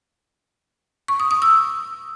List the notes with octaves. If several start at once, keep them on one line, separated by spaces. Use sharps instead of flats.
C#6
D#6
D#6
E6